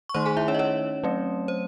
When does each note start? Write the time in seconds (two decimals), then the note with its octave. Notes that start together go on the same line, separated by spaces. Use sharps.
0.09 C#6
0.14 D#3 A3 D#4 C5 C6
0.26 G#4 G#5
0.37 E4 E5
0.48 C#4 C#5
0.54 D#5
0.59 C#4 C#5
1.04 F#3 A3 C4
1.48 C5